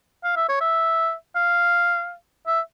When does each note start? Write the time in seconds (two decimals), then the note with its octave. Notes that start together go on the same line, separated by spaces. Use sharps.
0.24 F5
0.36 E5
0.49 C#5
0.61 E5
1.36 F5
2.47 E5